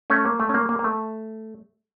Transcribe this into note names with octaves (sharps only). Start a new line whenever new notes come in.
A3 C#4
A#3
A3
C#4
A#3
A#3
A#3
A3